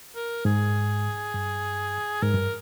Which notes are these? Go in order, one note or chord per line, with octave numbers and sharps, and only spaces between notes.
A#4
G#2 G#4
G2
G#2 A#4
G2